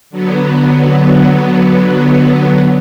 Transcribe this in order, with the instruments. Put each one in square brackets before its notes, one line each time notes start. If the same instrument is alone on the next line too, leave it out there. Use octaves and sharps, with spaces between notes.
[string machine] D3 F#3 B3